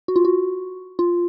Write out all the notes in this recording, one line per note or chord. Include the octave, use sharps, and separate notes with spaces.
F#4
F4
F#4
F4